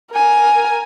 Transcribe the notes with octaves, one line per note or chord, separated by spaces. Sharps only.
A#4 G#5